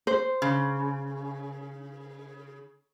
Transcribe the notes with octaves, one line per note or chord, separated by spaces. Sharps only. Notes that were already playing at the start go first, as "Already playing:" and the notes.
C5
C#3